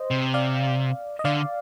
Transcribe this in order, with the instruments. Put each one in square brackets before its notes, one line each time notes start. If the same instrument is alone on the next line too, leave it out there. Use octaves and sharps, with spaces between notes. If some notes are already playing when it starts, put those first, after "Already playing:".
Already playing: [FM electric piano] C5 D#5
[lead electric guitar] C3
[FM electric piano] D5 F5
D#5
[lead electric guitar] D3 [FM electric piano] D5 F5